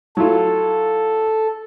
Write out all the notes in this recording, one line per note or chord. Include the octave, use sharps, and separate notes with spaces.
F#3 E4 F4 A4